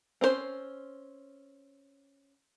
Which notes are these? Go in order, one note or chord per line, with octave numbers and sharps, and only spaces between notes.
C4 C#4 D#4 C5